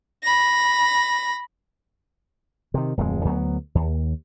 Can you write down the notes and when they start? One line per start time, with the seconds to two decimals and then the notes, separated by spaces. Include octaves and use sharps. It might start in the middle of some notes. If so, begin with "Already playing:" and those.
0.23 B5 A#6
2.74 C3 D#3
2.97 D1 F2 G3 G#3
3.25 D2 F#3 G3 B3
3.75 D#2